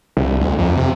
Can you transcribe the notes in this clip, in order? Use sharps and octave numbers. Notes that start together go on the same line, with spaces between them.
C2
D2
F2
C3